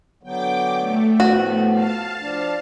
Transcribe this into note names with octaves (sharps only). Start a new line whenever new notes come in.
D3 F#3 B3 G5 D6
A3
A2 F3 B3 F#4
F5 A5
F3 D4